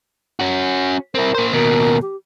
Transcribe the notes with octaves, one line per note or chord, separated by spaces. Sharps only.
C#4 F#4
C4 E4 A#4
A#3 C5
D#2 B2 A#4
G4